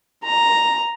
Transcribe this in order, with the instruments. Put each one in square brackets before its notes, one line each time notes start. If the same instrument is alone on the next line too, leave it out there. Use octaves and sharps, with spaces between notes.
[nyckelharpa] A#5